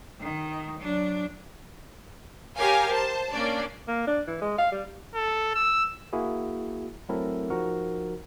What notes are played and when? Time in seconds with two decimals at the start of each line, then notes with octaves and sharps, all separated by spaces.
0.20 D#3
0.80 F#3 D4
2.57 G4 A#4 C#5 F5 G#5
2.90 C5 A5
3.31 A#3 C#4 D4 D5
3.88 A#3
4.07 D4
4.27 E3
4.41 G#3
4.58 F5
4.72 G3
5.15 A4
5.55 E6
6.13 A#3 E4 F#4 G#4
7.09 F#3 A3 C4 E4 A4 A#4
7.50 F3 D#4 F#4 A#4